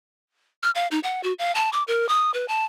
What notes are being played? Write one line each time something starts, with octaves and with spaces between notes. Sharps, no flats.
F6
F5
D#4
F#5
F#4
F5
A5
D6
A#4
D#6
B4
A5